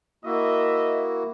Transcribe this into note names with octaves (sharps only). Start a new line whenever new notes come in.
A#3 E4 F#4 D#5 E5